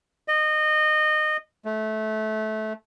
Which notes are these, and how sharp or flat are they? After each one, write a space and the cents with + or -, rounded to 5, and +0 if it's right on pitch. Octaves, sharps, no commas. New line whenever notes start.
D#5 -25
A3 -20